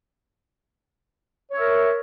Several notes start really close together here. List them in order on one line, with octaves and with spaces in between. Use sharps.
C#5 E5 A#4